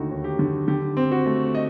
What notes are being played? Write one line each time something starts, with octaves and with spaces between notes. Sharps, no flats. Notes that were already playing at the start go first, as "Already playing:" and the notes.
Already playing: D#2 D3 A3 D#4 F#4
D#2
G4
D3
D3 G4
C4
F#4
A3
D#5